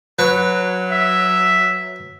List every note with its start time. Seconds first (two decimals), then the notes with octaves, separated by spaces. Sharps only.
0.19 F#3 B4 C#6
0.91 E5